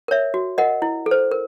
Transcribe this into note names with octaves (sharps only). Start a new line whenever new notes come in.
A#4 C#5 E5
F#4
A#4 D#5 F#5
E4
A4
C5
A#4